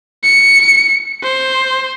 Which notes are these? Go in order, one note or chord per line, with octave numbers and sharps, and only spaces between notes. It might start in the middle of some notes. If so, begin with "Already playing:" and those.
C#7
C5